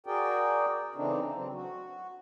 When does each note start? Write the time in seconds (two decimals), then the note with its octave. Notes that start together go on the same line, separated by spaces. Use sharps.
0.06 F#4 G#4 A#4 D5 G5
0.95 C#3 E3 A3 C4 D4 D#4
1.34 F#3 C4
1.54 F#4